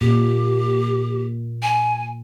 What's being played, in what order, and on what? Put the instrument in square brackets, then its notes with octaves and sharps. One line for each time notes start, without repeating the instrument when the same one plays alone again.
[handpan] A#2 [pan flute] G4
[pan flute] G#5